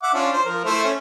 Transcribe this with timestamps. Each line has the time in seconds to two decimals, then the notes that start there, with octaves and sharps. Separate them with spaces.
0.03 E5 F#5 D6
0.14 C#4 D4 F4
0.33 C5
0.45 F3 A#4
0.64 A3 E4 C5
0.84 C#4